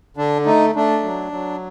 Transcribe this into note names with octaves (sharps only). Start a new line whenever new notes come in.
D3 D4
A3 D#4
A3 D4
F#3
F#3